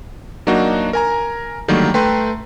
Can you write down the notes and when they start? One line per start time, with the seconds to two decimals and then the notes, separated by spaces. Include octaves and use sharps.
0.47 F#3 A#3 D4 D#4 F#4
0.93 A#4 G#5 A#5
1.68 D3 D#3 F#3 G3 A3 A#3
1.94 A3 B4 G5 A#5 C6